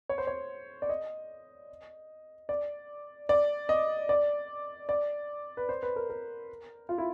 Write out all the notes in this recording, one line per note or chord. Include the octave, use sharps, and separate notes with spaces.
C#5
C5
C#5
D5
D#5
D5
D5
D#5
D5
D5
B4
C5
B4
A#4
A#4
F4
E4